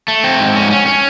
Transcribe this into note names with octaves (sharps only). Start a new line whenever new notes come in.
A3
C4
G#2
C#4
C#4
C#4